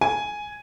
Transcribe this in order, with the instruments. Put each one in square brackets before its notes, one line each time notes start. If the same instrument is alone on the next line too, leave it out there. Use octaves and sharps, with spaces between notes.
[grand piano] G#5